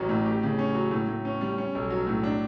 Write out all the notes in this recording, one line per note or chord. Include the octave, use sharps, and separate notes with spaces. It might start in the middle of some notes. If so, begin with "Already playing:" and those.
Already playing: A1 F#3 C#4
A2
G4
C#3
C#4
F#3
A2
A2
C#4
G3
C#4
B1
F#3
A2
D4